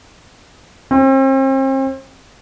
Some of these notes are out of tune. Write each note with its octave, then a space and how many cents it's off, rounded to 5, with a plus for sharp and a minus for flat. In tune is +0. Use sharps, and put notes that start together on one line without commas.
C4 +40